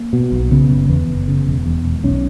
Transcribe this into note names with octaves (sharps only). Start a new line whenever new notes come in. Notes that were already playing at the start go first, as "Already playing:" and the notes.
Already playing: A#3
B2
B1
C#3 B3
F#1
E2 B3
F#1
C#3
E1
E2
E1
B1 C#4